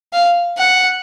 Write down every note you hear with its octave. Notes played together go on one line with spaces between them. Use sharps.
F5
F#5